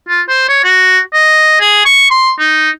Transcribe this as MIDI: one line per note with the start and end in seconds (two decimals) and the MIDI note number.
0.09 0.22 65
0.29 0.45 72
0.49 0.62 73
0.64 0.99 66
1.14 1.59 75
1.61 1.85 68
1.86 2.09 85
2.11 2.33 84
2.39 2.70 63